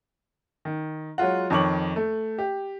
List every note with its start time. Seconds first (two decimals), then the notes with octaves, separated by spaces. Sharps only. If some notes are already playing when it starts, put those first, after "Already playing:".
0.65 D#3
1.18 F#3 G#3 F4 F#5
1.50 F2 D#3 C#5 C#6 D6 F#7
1.96 A3
2.38 G4